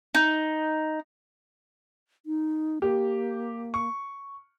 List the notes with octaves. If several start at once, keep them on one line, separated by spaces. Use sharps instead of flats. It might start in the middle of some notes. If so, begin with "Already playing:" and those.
D#4
D#4
A#3 G4
C#6